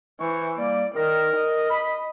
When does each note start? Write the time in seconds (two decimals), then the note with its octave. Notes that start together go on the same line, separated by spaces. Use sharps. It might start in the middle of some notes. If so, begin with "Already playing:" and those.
0.20 E3 C5 C#6
0.58 G3 A#3 D5
0.95 D#3 A#4
1.36 D#5
1.70 B5